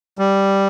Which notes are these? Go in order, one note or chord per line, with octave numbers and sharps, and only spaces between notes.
G3